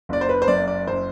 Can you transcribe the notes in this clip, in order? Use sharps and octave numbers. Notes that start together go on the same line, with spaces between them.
F#1 D5
C5
B4
C5
F#2 D5
D5
F#1 C5